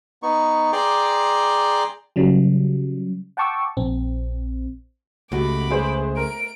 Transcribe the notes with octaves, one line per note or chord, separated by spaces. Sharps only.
B3 D#4 C#6
G#4 D5 G5 A#5 C6 D6
C#3 F#3 G3
F#5 G5 A5 C#6 D6 E6
A#1 C4
C#2 A3 F#4 G4 B5 D6
A3 G#4 B4 C5
A#4 D7